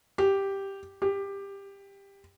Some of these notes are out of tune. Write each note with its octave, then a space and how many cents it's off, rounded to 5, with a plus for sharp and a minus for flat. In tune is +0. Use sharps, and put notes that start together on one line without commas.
G4 +0
G4 +15